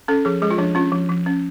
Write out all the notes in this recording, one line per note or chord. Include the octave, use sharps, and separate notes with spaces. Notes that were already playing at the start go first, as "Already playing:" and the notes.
C#4 A4
F3 G#4
G#3 G#4
F4
F3 D4
C#4 F4
F3
F3
C#4